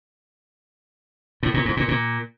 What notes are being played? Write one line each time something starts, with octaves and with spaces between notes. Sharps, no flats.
A2
A#2
G#2
A#2
A#2